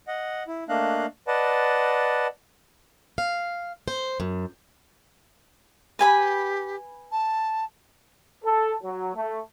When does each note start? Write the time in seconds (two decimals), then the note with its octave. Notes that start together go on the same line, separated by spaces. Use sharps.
0.08 D#5 F#5
0.47 E4
0.69 A3 A#3 D4 D#5 F5 F#6
1.27 B4 D5 D#5 F#5 A5
3.18 F5
3.88 C5
4.20 F#2
5.99 G4 B4 G#5 B5
7.12 A5
8.45 A4
8.84 F#3
9.16 A3